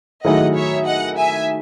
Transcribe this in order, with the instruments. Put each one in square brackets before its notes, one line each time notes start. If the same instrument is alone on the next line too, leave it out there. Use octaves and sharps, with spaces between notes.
[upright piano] D#3 F#3 A3 E4 G#4 [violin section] D#5 F#5
[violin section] C#5 E5
D#5 F#5
E5 G#5